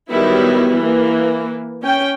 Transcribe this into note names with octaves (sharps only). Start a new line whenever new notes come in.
D#3 F#3 G3 B3 E4
E3 A#3
C#4 G5